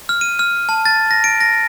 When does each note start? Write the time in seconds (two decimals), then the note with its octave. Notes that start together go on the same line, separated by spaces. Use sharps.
0.09 F6
0.21 D#7
0.39 F6
0.69 A5
0.86 A6
1.11 A#6
1.24 D7
1.41 A#6